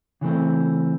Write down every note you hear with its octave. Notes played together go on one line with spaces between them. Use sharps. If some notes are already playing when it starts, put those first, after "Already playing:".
C#3 E3 A3 C4